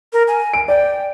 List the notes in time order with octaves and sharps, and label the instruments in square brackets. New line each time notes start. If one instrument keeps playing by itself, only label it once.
[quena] A#4
G#5
[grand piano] D7
[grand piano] D5 [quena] G5